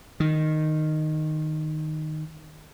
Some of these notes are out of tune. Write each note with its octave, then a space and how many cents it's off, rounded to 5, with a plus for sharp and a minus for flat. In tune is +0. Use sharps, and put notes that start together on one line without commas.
D#3 -10